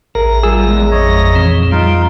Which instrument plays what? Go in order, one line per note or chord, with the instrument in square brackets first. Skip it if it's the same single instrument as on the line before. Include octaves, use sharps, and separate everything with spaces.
[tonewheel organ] A1 A#5 [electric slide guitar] G#4 [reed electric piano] A#4
[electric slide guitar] G3 F4 [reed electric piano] G#4 E6
[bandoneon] E2 [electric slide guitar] G#3
[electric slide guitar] F2 [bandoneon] C#5 D#5
[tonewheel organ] A#2 E3 C4
[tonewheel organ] G3 [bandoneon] D#4 F4 F5